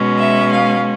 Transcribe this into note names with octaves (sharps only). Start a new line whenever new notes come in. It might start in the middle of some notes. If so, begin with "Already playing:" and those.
Already playing: B2 G#3 C#4
E5
F5